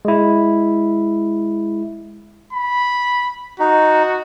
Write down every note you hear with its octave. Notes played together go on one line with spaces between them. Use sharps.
G#3 E4
B5
D#4 F#4